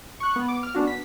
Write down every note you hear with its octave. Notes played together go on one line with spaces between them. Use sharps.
C#6 F#6
B3
D6
F6
B3 C#4 D4 F#4
B6